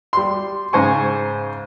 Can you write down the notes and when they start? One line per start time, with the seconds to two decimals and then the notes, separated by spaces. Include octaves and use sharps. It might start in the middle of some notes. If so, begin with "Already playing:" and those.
0.13 G3 C6
0.73 G#2 C#3 C5 G#5 C#6